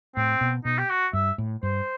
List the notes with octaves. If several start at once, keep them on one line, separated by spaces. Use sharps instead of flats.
A2 C4
B2
B2 D#4
G4
F#4
G2 E5
A2
G2 C5